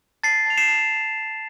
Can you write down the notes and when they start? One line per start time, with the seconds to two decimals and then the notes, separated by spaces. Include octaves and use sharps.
0.23 A5 A6 C7
0.46 A5 F7
0.57 C7 E7
0.68 A5